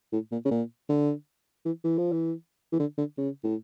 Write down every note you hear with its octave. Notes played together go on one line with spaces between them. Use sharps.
A2
A#2
C#3
A#2
D3
E3
E3
F3
E3
E3
D3
D3
C#3
A2